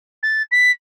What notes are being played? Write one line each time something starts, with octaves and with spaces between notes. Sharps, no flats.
A6
B6